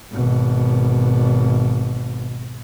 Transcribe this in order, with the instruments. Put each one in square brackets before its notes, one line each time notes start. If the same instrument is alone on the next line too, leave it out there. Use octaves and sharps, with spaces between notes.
[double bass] G#1 B2